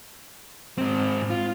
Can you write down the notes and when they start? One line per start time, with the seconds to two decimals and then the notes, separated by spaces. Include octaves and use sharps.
0.78 G#2 C4
1.30 F4